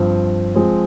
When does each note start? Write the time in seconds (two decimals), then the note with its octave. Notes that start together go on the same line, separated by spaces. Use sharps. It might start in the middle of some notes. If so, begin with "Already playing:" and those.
Already playing: G2 F3 C4
0.55 F3 G#3 C4